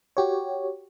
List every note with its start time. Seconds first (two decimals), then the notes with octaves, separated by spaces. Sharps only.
0.17 F#4 G4 C#5